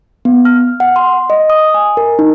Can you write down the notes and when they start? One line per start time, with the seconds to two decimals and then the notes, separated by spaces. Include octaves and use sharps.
0.25 B3
0.45 F6
0.80 F#5
0.96 C6
1.30 D#5
1.50 D#6
1.74 G#5
1.97 A#4
2.19 D#4